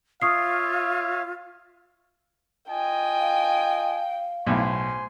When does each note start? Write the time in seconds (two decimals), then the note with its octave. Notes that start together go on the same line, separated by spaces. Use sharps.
0.22 F4 C#5 E5 F5 C#6 D#6 C7
2.69 F4 D#5 G5 G#5
3.20 F5
4.46 B1 A2 C5 G#5 C6